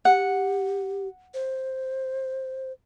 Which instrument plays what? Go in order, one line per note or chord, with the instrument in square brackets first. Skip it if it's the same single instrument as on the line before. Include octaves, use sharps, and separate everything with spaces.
[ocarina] G4 [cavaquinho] F#5
[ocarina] C5